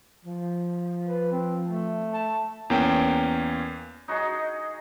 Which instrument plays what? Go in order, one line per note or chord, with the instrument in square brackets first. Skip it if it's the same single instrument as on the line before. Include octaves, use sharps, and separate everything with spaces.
[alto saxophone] F3
[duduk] B4
C4
A3
[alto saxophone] A5
[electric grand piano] E2 A#3 C#4 G5
[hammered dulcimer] D#4 F#4 G#4 D#5